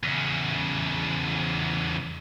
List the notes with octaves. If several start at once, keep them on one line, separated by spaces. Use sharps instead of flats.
E2 C#3